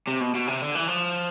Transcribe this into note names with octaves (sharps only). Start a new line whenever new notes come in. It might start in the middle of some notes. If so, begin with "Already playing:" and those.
C3
B2
B2
C3
D3
E3
F3